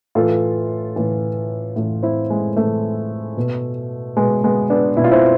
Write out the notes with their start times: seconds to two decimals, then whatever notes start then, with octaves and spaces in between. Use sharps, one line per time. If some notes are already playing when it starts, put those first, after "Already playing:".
0.15 A2 E3 F4 A4
0.96 A2 E3
1.76 A2 E3
2.03 C4 E4
2.30 G#3
2.56 A2 E3 A3
3.37 B2
4.17 B2 G#3 B3
4.44 G#3 B3
4.70 B3 D4
4.97 B2 E4
5.04 F4
5.11 C4 E4